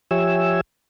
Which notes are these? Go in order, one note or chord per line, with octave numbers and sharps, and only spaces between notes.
F3 G4 C#5 E5 G#5 E6